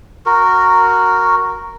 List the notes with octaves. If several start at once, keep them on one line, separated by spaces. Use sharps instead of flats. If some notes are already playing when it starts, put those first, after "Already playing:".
F#4 A#4